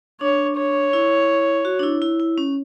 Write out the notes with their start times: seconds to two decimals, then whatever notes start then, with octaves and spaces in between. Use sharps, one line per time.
0.21 D4 C#5
0.57 C#5
0.93 E4
1.65 F#4
1.79 D4
1.83 E4
2.02 E4
2.20 E4
2.38 C#4